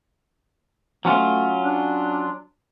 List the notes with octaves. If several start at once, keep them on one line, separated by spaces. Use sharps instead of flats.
F#3 A3 C#4 F4
D4